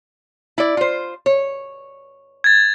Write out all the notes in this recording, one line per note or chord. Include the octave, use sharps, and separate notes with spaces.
E4 D5
F4 C5
C#5
G#6 A6